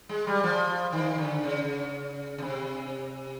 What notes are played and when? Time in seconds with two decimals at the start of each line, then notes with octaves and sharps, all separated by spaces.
0.09 G#3
0.27 G3
0.43 F3
0.93 D#3
1.18 D3
1.43 C#3
2.38 C#3
2.42 C3